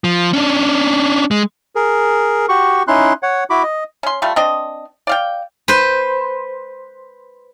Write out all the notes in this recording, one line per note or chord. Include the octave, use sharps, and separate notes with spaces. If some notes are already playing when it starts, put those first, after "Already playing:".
F3
C#4 D4
G#3
G#4 A#4
F#4 G4 C#6
C#4 D#4 E4 C6 F#6
C#5 F#5
E4 F#4 B5 D6
D#5
C#4 C6
G3 A3 F4
C4 D4 D#5
D5 F5 G5
B4 C5